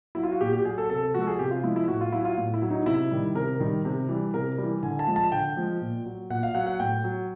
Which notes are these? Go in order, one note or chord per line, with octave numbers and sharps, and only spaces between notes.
F#3 E4
F4
F#4
A#2 G4
G4
F#3 G#4
A4
C3 A4
A4
F3 G#3 F#4 A4
G#4
C3 G4
F4
F3 G#3 E4
E4
A2 F#4
F4
F#3 E4
F4
A2
E4
F#3
D#4
C3 E4
D#3 G3
C3 A#4
D#3 G3
C3
E3 G3
C3 A#4
E3 G3
D3 G#5
A5
F3 G#3
A5
D3 G5
F3 G#3
A#2
F#3
A#2 F#5
F5
F#3 F#5
F#5
A2 G5
F#3